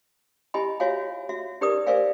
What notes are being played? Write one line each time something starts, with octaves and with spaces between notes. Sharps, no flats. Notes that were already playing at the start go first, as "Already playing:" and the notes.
E4 G4 D#5 G#5 B5
F4 F#4 C#5 E5 F5 G#5
F#4 E5
D#4 G4 A#4 B4 D5 D#6
A#4 C5 D5 E5 F5 G#5